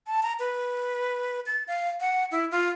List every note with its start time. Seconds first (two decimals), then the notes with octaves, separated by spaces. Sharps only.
0.07 A5
0.23 A#5
0.39 B4
1.46 A6
1.68 F5
2.01 F#5
2.31 E4
2.51 F4